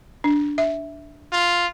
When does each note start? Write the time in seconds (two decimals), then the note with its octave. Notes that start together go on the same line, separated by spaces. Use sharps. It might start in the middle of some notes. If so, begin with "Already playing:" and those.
0.24 D4
0.58 E5
1.32 F4